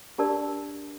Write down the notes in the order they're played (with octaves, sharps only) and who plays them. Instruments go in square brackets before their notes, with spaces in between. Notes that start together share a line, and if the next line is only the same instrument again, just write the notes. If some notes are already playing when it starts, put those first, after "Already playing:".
[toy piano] D4 G4 A#4 D5 A5